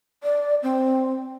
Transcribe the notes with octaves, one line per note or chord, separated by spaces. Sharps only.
D5
C4